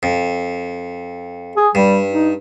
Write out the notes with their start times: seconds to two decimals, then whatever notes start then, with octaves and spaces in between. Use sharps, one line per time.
0.03 F2
1.57 G#4
1.75 G2 G3
2.11 D#4